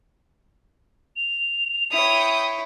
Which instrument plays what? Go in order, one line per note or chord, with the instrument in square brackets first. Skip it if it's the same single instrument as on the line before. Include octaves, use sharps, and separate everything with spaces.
[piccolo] F7
[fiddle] E4 C#5 [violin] G5 D#6